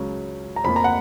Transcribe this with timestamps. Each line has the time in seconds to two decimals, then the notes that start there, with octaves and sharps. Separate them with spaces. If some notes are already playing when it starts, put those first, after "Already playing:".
Already playing: C#2 C#3 F#3 C#4
0.56 A#5
0.64 F2 F3 A#3 B5
0.76 A#5
0.84 F#5